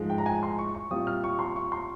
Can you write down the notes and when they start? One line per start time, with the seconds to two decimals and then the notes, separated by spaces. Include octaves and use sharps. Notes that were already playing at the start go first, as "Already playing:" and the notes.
Already playing: G#2 F3 G#3
0.10 G5
0.18 A#5
0.26 G#5
0.43 C6
0.58 C#6
0.75 C#6
0.91 A#2 G3 C4 F4 D#6
1.07 F6
1.24 C#6
1.39 C6
1.56 C#6
1.72 C6